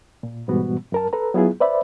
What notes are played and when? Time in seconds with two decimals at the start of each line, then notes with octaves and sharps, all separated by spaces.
0.23 A#2
0.48 G#2 B2 E3 G3 B3 F#4
0.92 F#2 A#4 A5
1.13 A4 B4 A#5
1.34 F#3 B3 E4 F4 G#4
1.60 B4 C5 D5 E5 B5